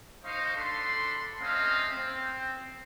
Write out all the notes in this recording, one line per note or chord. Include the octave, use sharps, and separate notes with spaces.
D#4 C5 D#5 F5 C6 C#6
D4 A4 B5 C6
A3 C4 C#4 D#5 F5
C4